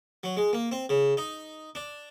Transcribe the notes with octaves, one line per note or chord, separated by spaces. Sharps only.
F#3
G#3
A#3
C4
C#3
D#4
D4